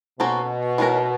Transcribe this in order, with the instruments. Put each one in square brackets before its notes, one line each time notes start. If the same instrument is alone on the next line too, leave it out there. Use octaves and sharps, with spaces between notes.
[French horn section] B2 [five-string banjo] A#3 C#4 F#4 A4 C5
[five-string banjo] E3 A3 C#4 F4 A#4